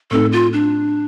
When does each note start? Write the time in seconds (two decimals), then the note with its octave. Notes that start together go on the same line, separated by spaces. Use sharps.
0.11 A2 A3 C4 D#4 A4
0.32 F4
0.53 D4